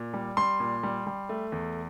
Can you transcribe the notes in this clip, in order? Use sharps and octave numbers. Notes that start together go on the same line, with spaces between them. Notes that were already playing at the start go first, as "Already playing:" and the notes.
Already playing: A#2
G3
G3 C6
A#2
G3
G3
A3
E2